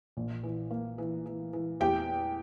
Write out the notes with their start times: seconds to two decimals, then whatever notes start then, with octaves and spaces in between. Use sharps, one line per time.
0.17 A#1
0.43 E3
0.71 A#3
0.98 E3
1.26 E3
1.53 E3
1.80 E2 G4 G5